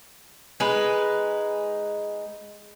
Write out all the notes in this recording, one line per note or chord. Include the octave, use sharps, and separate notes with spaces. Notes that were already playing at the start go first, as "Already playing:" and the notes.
G#3 D#4 B4